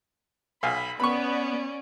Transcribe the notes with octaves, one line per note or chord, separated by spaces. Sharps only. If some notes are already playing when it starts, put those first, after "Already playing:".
B1 F5 G#5 B5
B3 C#4 D5 B5 C#6